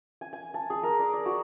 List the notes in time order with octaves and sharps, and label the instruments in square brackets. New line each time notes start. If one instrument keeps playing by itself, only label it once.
[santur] G#5
G#5
A5
G#4
A#4
D5
D5
F#4